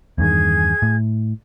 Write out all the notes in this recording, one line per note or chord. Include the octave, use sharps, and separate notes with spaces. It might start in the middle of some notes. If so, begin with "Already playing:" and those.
E2 G2 D#3 G#4 G#5 G#6
A2